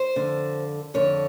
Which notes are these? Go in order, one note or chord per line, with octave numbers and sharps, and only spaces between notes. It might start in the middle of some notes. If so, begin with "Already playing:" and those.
Already playing: C5
F2 D3
F2 D3 C#5